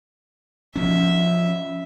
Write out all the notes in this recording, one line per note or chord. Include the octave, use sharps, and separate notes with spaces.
F3 C#4 E5